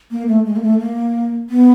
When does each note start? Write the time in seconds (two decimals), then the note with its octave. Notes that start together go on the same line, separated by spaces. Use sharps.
0.11 A#3
0.28 A3
0.45 G#3
0.56 A#3
0.63 A3
0.79 A#3
1.50 B3